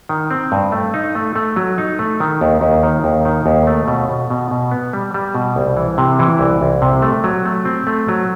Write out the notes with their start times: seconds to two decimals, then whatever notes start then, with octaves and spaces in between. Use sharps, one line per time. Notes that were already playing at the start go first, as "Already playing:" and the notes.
0.09 D#3
0.30 C4
0.52 G2
0.72 A3
0.94 D#4
1.15 A3
1.36 A3
1.56 F#3
1.78 D#4
1.99 A3
2.20 D#3
2.41 D#2
2.61 D#2
2.83 D#3
3.04 D#2
3.25 D#3
3.46 D#2
3.67 A3
3.88 B2
4.09 B2
4.30 B2
4.51 B2
4.71 B3
4.93 G3
5.14 G3
5.35 B2
5.56 C2
5.77 E3
5.98 C3
6.19 E3
6.39 C2
6.61 C2
6.82 C3
7.02 A3
7.24 F#3
7.46 A3
7.65 C4
7.87 A3
8.09 F#3